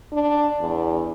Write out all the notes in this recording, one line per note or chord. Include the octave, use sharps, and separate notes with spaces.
D4
E2